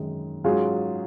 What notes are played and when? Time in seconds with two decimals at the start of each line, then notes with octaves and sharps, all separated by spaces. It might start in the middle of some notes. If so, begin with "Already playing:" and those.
Already playing: F#2 D#3 G#3 D#4
0.44 G#2 F#3 C#4 F4 G#4